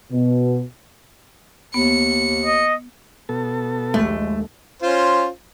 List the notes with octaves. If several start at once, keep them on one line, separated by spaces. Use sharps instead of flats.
B2
D#2 B3 C#7
D#5
B2 A4
A#1 D#2 G#3 A3
C#4 F4 C5